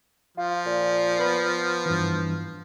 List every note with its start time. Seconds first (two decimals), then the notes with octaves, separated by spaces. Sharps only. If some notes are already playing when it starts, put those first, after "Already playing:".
0.37 F3 F4
0.66 A#2
1.19 B3 B5 C6
1.86 G2 E3